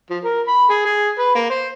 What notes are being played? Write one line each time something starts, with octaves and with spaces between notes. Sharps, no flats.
F3
A#4
B5
G#4
G#4
B4
A#3
C5